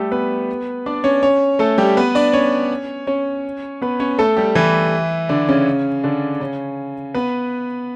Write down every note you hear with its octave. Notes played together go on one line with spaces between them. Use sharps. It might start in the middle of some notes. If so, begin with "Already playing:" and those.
Already playing: G3 A3 G4 A4
B3 B4
D4 D5
C#4 C#5
C#4 C#5
A3 A4
G3 G4
B3 B4
D4 D5
C#4 C#5
C#4 C#5
B3 B4
C#4 C#5
A3 A4
G3 G4
E3 E4
D3 D4
C#3 C#4
D3 D4
C#3 C#4
B3 B4